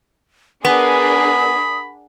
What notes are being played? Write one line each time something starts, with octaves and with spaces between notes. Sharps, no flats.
B3 D4 G#4 A#4 B5 D#6